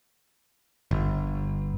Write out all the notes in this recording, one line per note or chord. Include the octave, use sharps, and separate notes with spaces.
G1